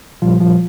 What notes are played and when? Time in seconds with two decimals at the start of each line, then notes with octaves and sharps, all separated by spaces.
0.22 A#2 F3 G3 F4
0.41 F3 F4